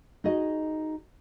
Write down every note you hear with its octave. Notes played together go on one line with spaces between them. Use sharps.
D#4 F#4 G#4 D#5